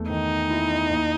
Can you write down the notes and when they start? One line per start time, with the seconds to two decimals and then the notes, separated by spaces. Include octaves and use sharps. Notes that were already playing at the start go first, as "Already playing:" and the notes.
Already playing: E2 A3
0.10 D#3 D#4
0.50 E4
0.90 D#2